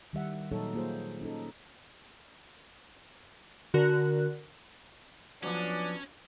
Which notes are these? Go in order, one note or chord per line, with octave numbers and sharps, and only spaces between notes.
D#3 G3 E5 F#5
A#2 F#3 D#4 A4 C#5
A#3 F4 G#4 C5
C#4 D#4 A4
D3 F#4 A#4 F#6
F3 F#3 B3 C#4 D4